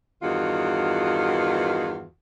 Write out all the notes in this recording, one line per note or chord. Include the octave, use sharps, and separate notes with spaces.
E2 G2 D#3 F4 F#4